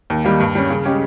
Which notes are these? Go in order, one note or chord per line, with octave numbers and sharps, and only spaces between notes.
D#2
D#3 G3 A#3
G2
G3 C#4
C#3
G#3 C#4 G4 C#5